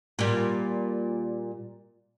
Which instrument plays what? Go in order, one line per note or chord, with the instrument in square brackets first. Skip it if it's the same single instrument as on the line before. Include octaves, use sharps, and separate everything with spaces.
[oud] A#2 G3